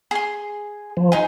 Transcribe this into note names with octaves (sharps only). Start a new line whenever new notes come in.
G#4 C6
F3
D#4 G#4